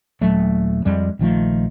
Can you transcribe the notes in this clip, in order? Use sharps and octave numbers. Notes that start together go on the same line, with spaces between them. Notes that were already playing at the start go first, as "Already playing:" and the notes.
D#1 F#3 A3
F2 G3 G#3
A#1 D#3 F3 A3